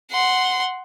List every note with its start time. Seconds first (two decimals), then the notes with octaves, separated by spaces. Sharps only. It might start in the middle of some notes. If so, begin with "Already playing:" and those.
0.12 F#5 C6